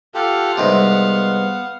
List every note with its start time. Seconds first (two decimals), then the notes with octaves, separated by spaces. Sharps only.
0.15 F4 G4 A4 F5 F#5
0.57 C2 G#2 C3 B3 B4